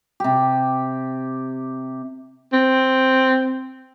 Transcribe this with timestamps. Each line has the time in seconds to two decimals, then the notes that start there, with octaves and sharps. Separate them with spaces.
0.20 C3 G4
2.53 C4